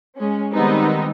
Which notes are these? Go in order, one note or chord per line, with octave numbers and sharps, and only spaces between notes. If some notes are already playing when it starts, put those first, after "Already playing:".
G#3 C#4
D#3 G3 G#3 B3 C4 D#4